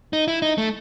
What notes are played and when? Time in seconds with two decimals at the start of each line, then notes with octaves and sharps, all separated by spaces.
0.13 D#4
0.28 E4
0.42 D#4
0.58 A3